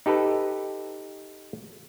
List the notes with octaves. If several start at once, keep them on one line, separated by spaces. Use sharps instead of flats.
D#4 G4 A4 B4